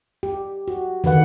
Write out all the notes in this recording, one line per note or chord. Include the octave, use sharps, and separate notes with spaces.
G4
F#4
D3 D#3 B4 F#5